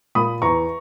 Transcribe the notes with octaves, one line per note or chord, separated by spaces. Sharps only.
A#2 B5 D#6
E2 A#5 C#6